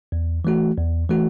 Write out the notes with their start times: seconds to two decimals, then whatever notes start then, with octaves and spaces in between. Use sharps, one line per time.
0.12 E2
0.45 E3 A3 F#4
0.77 E2
1.10 E3 A3 F#4